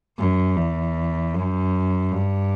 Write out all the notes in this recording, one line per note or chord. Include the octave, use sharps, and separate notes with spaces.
F#2
E2
F#2
G2